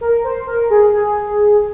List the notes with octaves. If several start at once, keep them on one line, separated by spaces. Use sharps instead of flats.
A#4
C5
A#4
G#4
G#4